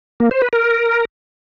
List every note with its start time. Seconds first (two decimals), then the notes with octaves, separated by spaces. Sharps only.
0.20 A#3
0.31 C5
0.42 B4
0.53 A#4